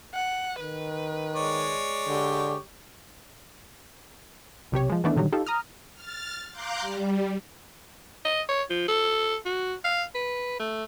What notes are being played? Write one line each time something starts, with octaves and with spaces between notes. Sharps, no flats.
F#5
D#3 B4
G#3 C#5 D5
D3 G4
B1 C3 G4 C#5
F3 G#3
D#3 E3 A3 B3 D4
A#2 D3 D#3 F#3 G3
D#4 F4 G4 A4
A#5 D#6 F6
F6 A6
F5 A#5 C6 D6 F#6 G6
G3
D#5
C#5
F3
A4
F#4
F5
B4
A3